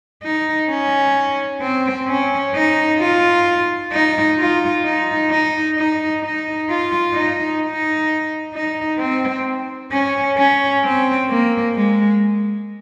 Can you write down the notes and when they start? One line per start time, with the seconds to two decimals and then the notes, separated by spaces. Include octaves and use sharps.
0.23 D#4
0.69 C#4
1.61 C4
2.08 C#4
2.55 D#4
3.00 F4
3.92 D#4
4.38 F4
4.85 D#4
5.31 D#4
5.77 D#4
6.23 D#4
6.69 F4
7.14 D#4
7.62 D#4
8.54 D#4
8.99 C4
9.92 C#4
10.37 C#4
10.84 C4
11.30 A#3
11.75 G#3